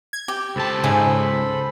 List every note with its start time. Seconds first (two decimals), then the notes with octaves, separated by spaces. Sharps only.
0.13 G#6
0.28 G4
0.56 C#2 A4 C5 A5 B5
0.84 G#2 C#3 G#5